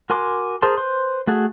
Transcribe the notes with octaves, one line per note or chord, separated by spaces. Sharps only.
F#4 A#4 G#5 C6 D6
G#4 A#4 C5 A5 C6
B4 C5 C6
A3 F#4 G#4 A4